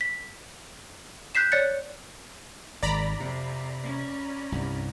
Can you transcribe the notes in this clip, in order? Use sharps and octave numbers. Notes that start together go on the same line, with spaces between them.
B6
F#6 G6 B6 C7 E7
C#5 D5 F#6 A6 C#7
G#1 D5 A#5 B5
F2 C3
C#4
C2 G2